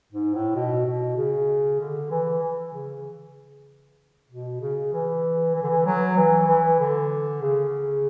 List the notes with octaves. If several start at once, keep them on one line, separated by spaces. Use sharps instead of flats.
G#2
A2
B2
B2
C#3
D3
E3
E3
C#3
B2
C#3
E3
E3
D3
E3
F#3
E3
E3
D3
C#3